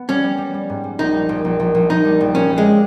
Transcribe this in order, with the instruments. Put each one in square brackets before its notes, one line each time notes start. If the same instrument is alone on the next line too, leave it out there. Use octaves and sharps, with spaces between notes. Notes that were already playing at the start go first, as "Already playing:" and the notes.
Already playing: [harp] B3
[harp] G3 [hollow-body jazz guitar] C#4
[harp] G3
G3
G3
G#2
G3
[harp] A#1 [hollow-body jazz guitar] D#4
[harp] G3
A#1
A#1
A#1
A#1
[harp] A#1 [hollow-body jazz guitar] D#4
[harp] G3
A#1
[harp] A#1 [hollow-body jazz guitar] C#4
[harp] G3
[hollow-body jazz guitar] G#3